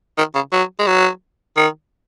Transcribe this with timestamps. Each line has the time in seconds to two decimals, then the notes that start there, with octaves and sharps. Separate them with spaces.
0.18 D#3
0.35 C#3
0.52 F#3
0.79 G#3
0.87 F#3
1.57 D#3